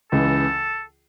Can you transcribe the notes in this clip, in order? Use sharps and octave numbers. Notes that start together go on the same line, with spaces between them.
C#2 C#3 E3 A4